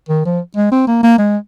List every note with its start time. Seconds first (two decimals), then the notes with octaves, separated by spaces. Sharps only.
0.09 D#3
0.25 F3
0.57 G#3
0.72 C4
0.87 A#3
1.03 A#3
1.18 G#3